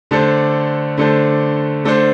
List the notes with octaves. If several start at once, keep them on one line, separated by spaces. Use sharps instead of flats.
D3 A3 D4 A4 C5
D3 A3 D4 A4 C5
D3 A3 D4 A4 C5